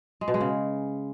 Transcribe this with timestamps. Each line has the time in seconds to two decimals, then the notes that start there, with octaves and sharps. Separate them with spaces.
0.21 G#3
0.28 B2
0.34 G#3
0.41 C#3